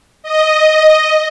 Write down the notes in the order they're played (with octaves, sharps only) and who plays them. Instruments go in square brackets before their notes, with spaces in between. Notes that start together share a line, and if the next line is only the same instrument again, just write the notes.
[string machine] D#5